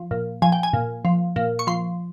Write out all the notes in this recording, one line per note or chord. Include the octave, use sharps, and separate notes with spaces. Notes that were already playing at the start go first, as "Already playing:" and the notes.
Already playing: F3
A#2
F3 G#5
G5
G#5
A#2
F3
A#2
C#6
F3 C6